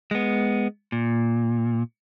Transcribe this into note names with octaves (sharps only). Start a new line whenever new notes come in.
G#3 B3
A#2